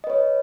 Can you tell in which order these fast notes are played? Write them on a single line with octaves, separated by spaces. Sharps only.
D#5 B4 C#5